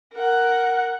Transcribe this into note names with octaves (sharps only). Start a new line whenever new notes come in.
A#4 F#5